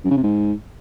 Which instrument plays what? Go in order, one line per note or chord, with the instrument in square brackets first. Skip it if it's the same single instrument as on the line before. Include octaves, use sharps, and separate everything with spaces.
[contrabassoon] F#2
C#3
C3
G#2